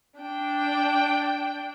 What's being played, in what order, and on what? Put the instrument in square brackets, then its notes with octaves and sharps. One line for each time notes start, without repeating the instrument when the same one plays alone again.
[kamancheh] D4 G5